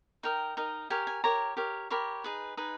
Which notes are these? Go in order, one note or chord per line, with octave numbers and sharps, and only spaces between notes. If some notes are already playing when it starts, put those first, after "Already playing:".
D#4 A#4 D#5 G5
D#4 A#4 D#5
G4 A#4 C#5 G#5
G#5
G4 A#4 C#5 A#5
G4 A#4 C#5
G4 A#4 C#5 B5
D#4 G#4 B4
D#4 G#4 B4